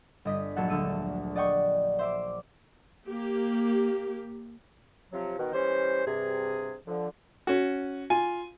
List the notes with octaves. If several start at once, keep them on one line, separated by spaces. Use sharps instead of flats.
G1 D#5 B6
A#1 F#3 F#4 A4 F#5
D2 E6 D#7
D5 D#5 F#5 G5 C#6 D#6
C5 E5 D6
A#3 G4
C3 F3 F#3
B2 D#3
E3 G3 C#4 C5
G2 C3 G#4
D3 F3
C#4 F#4
F4 G#5